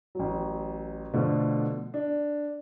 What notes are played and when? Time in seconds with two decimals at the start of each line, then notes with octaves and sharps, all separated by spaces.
0.15 A1 F#3
1.13 B2 D3 F3 A3 B3 A4
1.94 D4